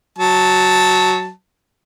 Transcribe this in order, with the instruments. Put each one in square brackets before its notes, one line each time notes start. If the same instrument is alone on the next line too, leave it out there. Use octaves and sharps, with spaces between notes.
[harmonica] F#3 A5